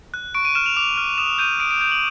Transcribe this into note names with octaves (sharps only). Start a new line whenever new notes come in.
F#6
C#6 D7
D#7
F6 E7
F7
D6 F7
F6
D#6 E7
G6 D#7
D#6 D7
D7
G6 D7
F#7